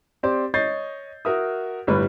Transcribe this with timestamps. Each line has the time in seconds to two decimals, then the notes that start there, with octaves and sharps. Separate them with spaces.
0.23 C4 G4 C5 D5
0.54 C#5 D#5 G6 A6 C7
1.25 F#4 A#4 E5 D#6
1.87 G1 A2 G3 B4